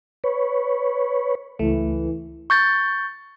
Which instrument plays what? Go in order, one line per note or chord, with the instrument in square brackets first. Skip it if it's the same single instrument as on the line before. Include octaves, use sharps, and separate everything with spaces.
[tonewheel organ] B4 C#5
[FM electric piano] C#2 A3 [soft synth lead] E3
[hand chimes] C#6 G6 A6